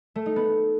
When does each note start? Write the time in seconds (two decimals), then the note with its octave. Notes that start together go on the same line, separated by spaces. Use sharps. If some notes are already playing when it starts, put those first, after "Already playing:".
0.16 A3
0.26 D#4
0.36 B3